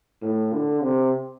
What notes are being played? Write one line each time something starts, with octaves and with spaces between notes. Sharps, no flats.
A2
D3
C3